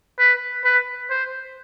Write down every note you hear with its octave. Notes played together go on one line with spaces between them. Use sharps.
B4
B4
C5